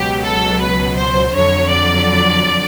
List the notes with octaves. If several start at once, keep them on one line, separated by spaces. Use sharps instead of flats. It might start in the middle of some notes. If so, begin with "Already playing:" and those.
Already playing: C#2 B2 F#3 G4
A4
B4
C5
F2 D3 F#3 C#5
D5